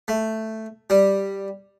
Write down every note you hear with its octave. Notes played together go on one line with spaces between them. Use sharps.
A3
G3